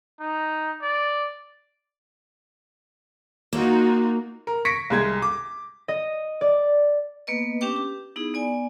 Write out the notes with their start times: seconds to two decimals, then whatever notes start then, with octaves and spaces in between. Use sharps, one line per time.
0.20 D#4
0.82 D5
3.53 A#3 D#4 F4 F#4
4.47 A#4
4.65 C#6 A#6 B6 C#7 D7
4.90 C2 G#3 G#6
5.22 D6
5.88 D#5
6.41 D5
7.27 A#3 B3 B4 D#5
7.61 C#4 D4 G4 B4 G5 D6
7.76 G4
8.16 B3 D#4 E4 G#4
8.34 B3 D5 G#5